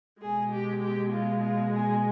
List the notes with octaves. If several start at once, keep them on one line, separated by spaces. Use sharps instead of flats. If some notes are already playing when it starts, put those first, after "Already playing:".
B2 G#3 G#4
G4
G4
F4
F4
G#4